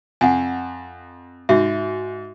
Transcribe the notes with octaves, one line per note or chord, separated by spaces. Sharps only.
F2 F#5 G#5
G#2 F#4 E5